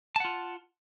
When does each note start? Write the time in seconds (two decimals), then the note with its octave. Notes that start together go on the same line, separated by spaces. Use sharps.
0.16 A5
0.20 F#5
0.25 F4